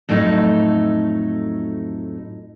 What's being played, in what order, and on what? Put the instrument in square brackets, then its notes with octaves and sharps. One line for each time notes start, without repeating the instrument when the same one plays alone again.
[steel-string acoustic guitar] F2 A2 F#3 A3 D#4